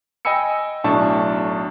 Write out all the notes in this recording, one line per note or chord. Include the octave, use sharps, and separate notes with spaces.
D#5 G5 G#5 B5 E6 C#7
B1 A2 D4 A5 C#6